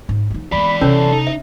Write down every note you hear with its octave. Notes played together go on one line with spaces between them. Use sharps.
G#2
F3 D#4
E3 G#3 B3 D5 B5
C3 C#4 A4 C#5
D#4
E5